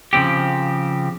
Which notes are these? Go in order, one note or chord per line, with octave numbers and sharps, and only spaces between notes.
C#3 F3 C4 G4